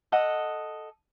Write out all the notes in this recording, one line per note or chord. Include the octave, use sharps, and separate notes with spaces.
A4 D#5 F#5